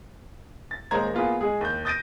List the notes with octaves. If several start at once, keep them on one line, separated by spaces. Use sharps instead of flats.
A6
D#1 G#3 A#3 C5 A#5 G#6
A#3 B3 F4 G#4
G#3 G#4
D#2 G6
D#6 G6 A6 A#6 D7 D#7